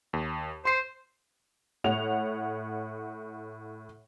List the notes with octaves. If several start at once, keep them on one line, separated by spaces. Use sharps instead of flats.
D#2
C5 C6 C7
A2 C#5 F#5 F7